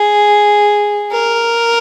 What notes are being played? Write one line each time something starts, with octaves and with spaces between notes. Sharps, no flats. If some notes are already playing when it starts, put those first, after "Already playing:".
Already playing: G#4
A#4